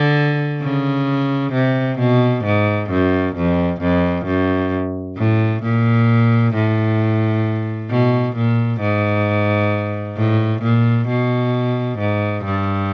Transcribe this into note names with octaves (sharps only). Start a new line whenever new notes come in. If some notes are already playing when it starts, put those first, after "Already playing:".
Already playing: D3
C#3
C3
B2
G#2
F#2
F2
F2
F#2
A2
A#2
A2
B2
A#2
G#2
A2
A#2
B2
G#2
G2